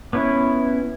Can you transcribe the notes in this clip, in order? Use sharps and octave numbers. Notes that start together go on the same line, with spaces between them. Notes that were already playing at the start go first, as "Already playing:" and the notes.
B3 C#4 E4